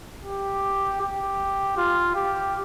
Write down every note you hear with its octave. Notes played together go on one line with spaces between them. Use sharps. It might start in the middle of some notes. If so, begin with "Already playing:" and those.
G4
G4
F4
G4